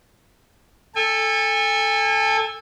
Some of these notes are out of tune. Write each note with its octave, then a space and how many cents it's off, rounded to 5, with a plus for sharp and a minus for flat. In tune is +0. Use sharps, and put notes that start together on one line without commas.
A4 +0 G#5 -35